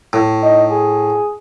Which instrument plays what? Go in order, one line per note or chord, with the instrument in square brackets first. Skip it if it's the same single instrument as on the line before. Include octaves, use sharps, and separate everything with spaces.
[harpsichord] A2
[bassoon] D#4
G#4